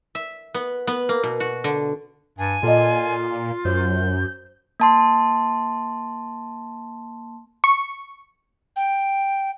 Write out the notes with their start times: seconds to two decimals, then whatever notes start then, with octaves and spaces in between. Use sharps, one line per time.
0.15 E5
0.54 B3
0.87 B3
1.09 A#3
1.23 B2
1.40 F#4
1.64 D3
2.38 G2 G#5
2.63 A#2 F4 A4 D5 D#5
3.65 F#2 C5 G6
4.80 A#3 A5 C6
7.64 C#6
8.76 G5